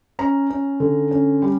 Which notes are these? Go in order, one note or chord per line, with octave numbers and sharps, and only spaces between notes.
C#4 A#5
C#4
D3
C#4
G3